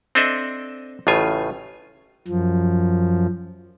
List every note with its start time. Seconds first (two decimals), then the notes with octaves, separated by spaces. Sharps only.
0.15 C4 D4 A4 D#5 E5
1.07 A1 A2 C#3 F4 G#5
2.28 F#2 F3